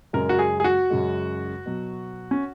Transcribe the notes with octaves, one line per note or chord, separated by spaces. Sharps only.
F#2 C#3 G#3 A#4
F#4
G#4
G#4
F#4
F#2 C#3 G#3
B2 F#3
C#4